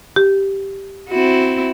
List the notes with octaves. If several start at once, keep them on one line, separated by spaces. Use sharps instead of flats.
G4
C4 E4 F#4